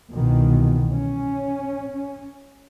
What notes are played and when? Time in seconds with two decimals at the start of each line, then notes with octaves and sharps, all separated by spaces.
0.13 C2 B2 D#3 E3
0.94 C#4